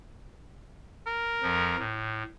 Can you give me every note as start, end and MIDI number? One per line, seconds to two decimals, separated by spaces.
1.07 1.87 70
1.43 1.76 41
1.43 1.76 53
1.78 2.23 45